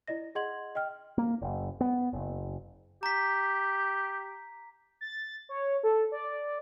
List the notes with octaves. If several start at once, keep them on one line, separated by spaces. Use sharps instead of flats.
E4 D5 D#5 A#6
G#4 D#5 F#5 C6 G#6 F#7
D#5 G5 F6
A#3
F#1
B3
F#1
G4 A#5 B6
A6
C#5
A4
D5